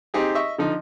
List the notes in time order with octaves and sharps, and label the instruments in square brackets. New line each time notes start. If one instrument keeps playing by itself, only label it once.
[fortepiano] C4 D#4 G4 G#4
D#5 E5 C#6
D3 F3 D#4